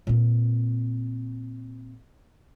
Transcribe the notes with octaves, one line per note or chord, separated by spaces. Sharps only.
A#2 C4